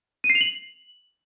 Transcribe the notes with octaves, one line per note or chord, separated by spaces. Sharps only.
D#7
C7
F7
F#7